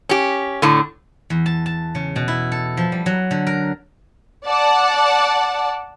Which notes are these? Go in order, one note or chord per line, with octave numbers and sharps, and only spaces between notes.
C#4 G4
A2 D3
E2
A5
A5
C#3
B2
E4
A4
F3
G3
F#3
D3
A#4
D5 F#5 A5